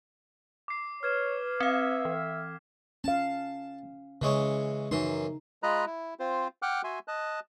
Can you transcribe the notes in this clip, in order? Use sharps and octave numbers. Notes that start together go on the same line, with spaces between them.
D6 C7
B4 C#5 F6 G#6 E7
C4 E5 F5 B6
E3
C#4 F5 A5
C#3 E3 G#3 C#5
F#2 E3 D#4 C6
G#3 F4 D#5 A#5 B5 F#6
E4
C4 F4 C5
F#5 G5 D6 F6 F#6
F#4 E5 G#5 C6
D#5 A5 F#6